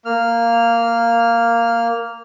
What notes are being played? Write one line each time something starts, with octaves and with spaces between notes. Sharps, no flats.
A#3 F6